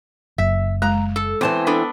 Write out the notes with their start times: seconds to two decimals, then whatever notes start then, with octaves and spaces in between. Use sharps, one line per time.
0.38 F#1 E5
0.82 G#3 A#5
1.16 A4
1.41 E2 E3 C4 A5
1.67 B3 D4 A4